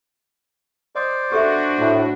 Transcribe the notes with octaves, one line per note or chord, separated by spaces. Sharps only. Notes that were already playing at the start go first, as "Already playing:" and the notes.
C5 D5 D#5 D#6
D4 F#4 G4 A4 E5
A2